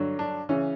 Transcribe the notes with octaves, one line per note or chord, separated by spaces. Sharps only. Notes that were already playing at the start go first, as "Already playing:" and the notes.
Already playing: G2 D3 F#3
D4
C#3 E3 C#4